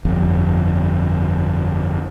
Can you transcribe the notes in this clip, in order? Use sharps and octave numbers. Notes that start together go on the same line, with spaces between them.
G1 F2